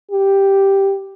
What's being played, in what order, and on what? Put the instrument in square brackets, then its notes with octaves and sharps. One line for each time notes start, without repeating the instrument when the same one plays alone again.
[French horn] G4